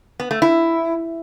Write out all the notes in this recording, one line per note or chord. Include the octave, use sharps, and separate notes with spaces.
B3
A3
E4